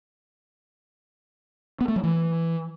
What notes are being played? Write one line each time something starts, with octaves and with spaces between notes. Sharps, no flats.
B3
A3
F#3
E3